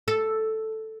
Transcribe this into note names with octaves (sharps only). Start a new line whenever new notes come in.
A4